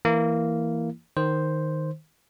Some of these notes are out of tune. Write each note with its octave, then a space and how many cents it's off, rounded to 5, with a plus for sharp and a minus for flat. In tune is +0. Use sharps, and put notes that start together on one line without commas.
E3 +0 A#3 -10 E4 +0
D#3 +0 C5 +0